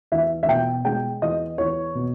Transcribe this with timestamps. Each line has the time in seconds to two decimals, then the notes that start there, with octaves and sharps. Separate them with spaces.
0.12 E2 E5
0.43 E5
0.48 B2 G5
0.85 G#3 G5
1.22 E2 D#5
1.58 E2 C#5
1.95 B2